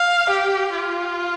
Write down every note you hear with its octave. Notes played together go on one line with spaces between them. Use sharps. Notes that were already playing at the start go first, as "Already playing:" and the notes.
Already playing: F5
G4
F4